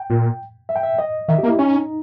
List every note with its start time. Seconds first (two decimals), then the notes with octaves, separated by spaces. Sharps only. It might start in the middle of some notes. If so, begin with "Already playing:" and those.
Already playing: G5
0.10 A#2
0.69 E5
0.76 G5
0.83 E5
0.99 D#5
1.28 D#3 E5
1.38 G4
1.43 A#3
1.48 E4
1.58 C#4 D#4